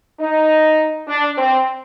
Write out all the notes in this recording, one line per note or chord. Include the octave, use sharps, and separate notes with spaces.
D#4
D4
C4